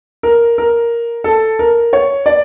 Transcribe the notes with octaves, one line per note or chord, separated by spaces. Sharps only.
A#4
A#4
A4
A#4
C#5
D5